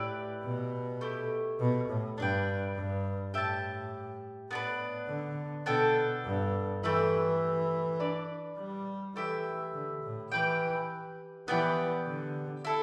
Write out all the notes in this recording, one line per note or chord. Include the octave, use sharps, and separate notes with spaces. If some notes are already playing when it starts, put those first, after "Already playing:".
Already playing: A2 E4 G4 B4 D5
B2
A3 E4 G4
B2
A2
G2 D4 B4 G5
G2
A2 G4 E5 A5
A2 B3 D4 B4
D3
B2 B3 D4 A4 G5
G2
E3 A3 G4 B4 E5
D4 B4 D5
G3
E3 A3 E4 G4 E5
D3
A2
E3 G4 B4 G5
E3 B3 G4 D5 G5
D3
E4 A4